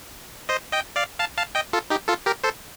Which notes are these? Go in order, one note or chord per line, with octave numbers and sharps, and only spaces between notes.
C5 D#5
D#5 G5
D5 F5
F5 A5
F5 A5
D#5 G5
F4 A4
D#4 G4
F4 A4
G4 A#4
A4 C5